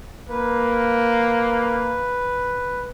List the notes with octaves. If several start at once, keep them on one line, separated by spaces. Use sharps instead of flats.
A#3 B4